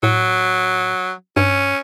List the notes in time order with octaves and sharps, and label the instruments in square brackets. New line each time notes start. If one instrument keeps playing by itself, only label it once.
[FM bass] A2 [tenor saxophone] F#3
[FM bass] G2 [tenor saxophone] C#4